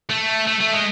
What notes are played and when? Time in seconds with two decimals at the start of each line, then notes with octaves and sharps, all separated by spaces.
0.10 A3
0.47 A3
0.61 A3
0.73 G#3